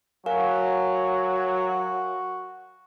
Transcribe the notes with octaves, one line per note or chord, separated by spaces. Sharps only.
F#3 F#4 A#4 F5 G#5